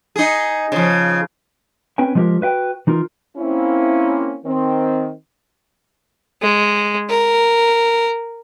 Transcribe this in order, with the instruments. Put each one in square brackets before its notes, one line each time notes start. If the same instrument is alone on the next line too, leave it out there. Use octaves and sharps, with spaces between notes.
[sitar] D#4 G#4
C#3 F3
[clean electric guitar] C4 C#4 B4 G5 G#5
F3 G#3 B3 F4 G4 A#4
F#4 B4 E5 G5
E3 D#4 F4 A#4
[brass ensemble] A#3 C4 C#4 E4
D#3 C4
[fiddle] G#3
A#4